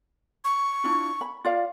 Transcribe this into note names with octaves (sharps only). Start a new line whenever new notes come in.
C#6
D4 E4 F4
B5
F4 D5 F5